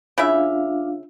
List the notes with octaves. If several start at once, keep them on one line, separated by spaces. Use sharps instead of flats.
C#3 D4 E4 F4 E5 F5